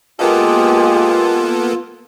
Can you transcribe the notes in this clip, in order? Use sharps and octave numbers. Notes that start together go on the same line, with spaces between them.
G#3 A#3 B3 F4 G4 A4